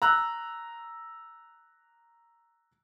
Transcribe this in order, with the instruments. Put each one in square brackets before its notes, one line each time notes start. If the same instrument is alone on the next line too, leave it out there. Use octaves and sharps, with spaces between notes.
[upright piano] A#5 E6 F#6